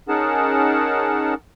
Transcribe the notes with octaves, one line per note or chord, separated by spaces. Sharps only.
C#4 D#4 G#4 A#4 F#5 A5